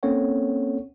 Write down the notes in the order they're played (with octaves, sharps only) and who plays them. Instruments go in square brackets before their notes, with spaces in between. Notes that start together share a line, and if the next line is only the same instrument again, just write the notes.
[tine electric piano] A#3 C4 C#4 A4 C#5 F#5